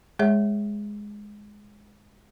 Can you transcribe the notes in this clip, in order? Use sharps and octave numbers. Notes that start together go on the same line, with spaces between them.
G#3 G#4 C#5 E5